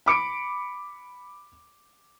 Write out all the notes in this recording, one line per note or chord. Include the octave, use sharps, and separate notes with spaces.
B5 D6 C#7 D7